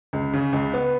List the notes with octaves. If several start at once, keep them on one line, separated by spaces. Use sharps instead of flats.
C#2
C#3
C#2
B3